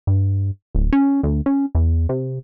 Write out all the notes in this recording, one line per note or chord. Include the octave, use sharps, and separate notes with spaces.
G2
D1
C#4
D2
C#4
E2
C3